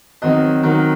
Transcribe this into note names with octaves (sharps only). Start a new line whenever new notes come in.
D#3 F#3 C4 D#5
D#3 F#3 C4